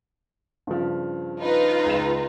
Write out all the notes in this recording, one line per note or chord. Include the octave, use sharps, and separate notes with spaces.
G2 C#3 F3
D#4 F4 B4
C#2 E7